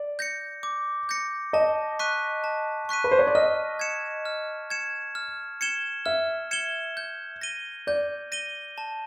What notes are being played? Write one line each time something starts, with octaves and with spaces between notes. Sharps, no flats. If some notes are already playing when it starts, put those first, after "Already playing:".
Already playing: D5
G6 A#6 C#7
D6
G6 A#6 C#7
D#5 A5
C#6 F#6 B6 D#7
A5
C#6 F#6 B6 D#7
B4
C5
C#5
D5
D#5 F6
G#6 C#7 E7
F6
G#6 C#7 E7
F6
G#6 C#7 E7 G7
E5 F6
G#6 C#7 E7 G7
G6
A#6 D#7 G7
D5 G6
A#6 D#7 G7
A5